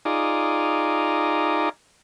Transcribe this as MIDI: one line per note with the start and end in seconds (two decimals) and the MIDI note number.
0.05 1.69 63
0.05 1.69 65
0.05 1.69 68
0.05 1.69 74
0.05 1.69 82